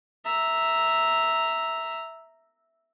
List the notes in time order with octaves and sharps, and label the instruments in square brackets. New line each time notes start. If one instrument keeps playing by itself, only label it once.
[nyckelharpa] E5 A#5